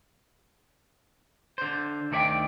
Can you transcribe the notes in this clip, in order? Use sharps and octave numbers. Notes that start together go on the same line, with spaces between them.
D3 C5
D2 D#3 A4 D5 E5 G5